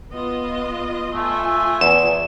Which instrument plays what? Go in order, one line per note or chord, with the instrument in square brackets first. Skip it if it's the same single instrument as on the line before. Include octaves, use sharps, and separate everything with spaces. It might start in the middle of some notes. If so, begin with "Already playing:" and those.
[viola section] B3 F4 D#5
[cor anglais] A3 [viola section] F4 G#5
[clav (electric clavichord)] E2 [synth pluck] E7